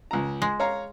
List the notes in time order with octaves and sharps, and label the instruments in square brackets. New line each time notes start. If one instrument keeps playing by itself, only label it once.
[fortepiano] C#2 A#5
[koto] G#3
[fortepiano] C#5 F5 A#5